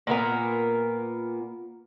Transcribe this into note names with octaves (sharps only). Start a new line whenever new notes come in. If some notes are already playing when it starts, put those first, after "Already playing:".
A#2 A#3 B3 A#4